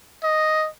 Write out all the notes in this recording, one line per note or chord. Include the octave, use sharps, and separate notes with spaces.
D#5